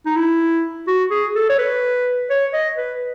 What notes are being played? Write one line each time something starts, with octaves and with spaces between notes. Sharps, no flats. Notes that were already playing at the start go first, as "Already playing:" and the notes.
D#4
E4
F#4
G#4
A4
C#5
B4
C#5
D#5
B4